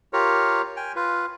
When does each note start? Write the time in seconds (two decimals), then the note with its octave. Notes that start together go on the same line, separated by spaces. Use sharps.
0.13 F4 G4 A#4 C#5
0.76 G5 G#5
0.96 F4 B4